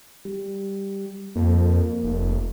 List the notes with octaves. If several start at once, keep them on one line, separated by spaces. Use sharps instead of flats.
G3
F2 A#3
F1